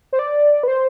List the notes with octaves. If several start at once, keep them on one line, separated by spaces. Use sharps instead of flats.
C5
D5
B4
C5